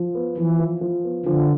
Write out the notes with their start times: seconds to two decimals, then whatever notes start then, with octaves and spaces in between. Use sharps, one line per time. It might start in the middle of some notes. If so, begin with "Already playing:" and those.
Already playing: F3
0.15 B3
0.37 E3 F3
0.59 F3
0.81 F3
1.04 B3
1.26 D3 F3